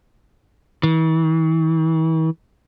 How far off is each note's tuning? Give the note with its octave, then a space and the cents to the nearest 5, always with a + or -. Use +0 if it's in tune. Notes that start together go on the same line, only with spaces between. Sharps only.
E3 -40